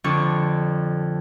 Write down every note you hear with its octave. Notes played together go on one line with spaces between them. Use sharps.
F2 D3 D4 C#6